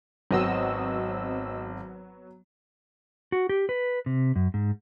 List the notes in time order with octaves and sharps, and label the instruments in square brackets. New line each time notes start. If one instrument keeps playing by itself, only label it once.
[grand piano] G#1 [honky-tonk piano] F#3 B3 F#4 [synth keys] C4 D#5 E6
[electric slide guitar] F#4
G4
B4
C3
F#2
G#2